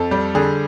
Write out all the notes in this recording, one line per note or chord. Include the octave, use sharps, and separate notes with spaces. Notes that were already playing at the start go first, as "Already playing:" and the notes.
Already playing: F2 A4
G3
D3 G#4